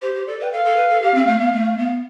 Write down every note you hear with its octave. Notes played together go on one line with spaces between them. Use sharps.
G4 C5
G4
A4 D5
B4 G5
A4 F5
A4
B4
A4
G4
C4
A3
B3
A3
B3